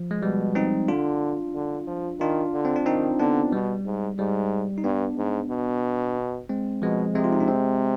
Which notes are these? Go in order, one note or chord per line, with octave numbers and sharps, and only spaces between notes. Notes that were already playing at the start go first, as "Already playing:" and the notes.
Already playing: F3
G#3
B2 G3
C4 D#4
D3 D4 F4
D3
F3
D#3 D4 F4
D3
C4
D4
D#3 C4 D#4
D3 B3 D4
B2 G3
G#2
G#2 G3
D#4
G2 B3 D4
G#2
B2
G#3 C4
B2 F3 G#3
C3 G#3 C4
F4
D#4
D4
G#3 C4